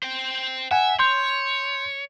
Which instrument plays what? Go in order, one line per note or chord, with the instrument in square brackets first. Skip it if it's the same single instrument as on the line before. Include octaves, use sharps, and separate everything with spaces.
[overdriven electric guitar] C5 G5
[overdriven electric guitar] E5 [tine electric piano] F#5 G#5
[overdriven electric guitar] C#5 [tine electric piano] C6 G6